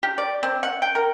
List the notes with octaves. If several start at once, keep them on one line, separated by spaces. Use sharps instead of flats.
G4
D5
C4
F#5
G5
A#4